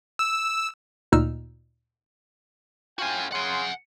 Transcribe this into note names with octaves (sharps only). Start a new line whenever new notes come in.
E6
D2 A#2 D#4 E6 F6
A2 F4 F#4 G5 G#5
C#3 F#5 G#5 C6